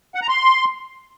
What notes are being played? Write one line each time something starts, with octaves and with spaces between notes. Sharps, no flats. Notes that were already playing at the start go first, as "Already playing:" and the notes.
F#5
A#5
C6